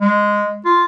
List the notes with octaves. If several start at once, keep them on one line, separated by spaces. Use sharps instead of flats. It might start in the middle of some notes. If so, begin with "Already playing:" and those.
G#3
F4